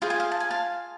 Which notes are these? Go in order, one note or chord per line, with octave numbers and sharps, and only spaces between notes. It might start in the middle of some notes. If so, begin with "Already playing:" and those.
F4 G#4 C5 F5
G#5
F5
A5
G#5
F5 A5